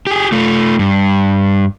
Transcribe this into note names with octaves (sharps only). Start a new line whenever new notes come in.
G4 G#4
A3 F4
G2